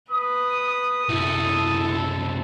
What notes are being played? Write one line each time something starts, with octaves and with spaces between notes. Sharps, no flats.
B4 D#6
C2 F#2 E4 A4